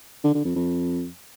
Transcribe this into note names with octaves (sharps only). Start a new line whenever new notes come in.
D3
D3
F2
F2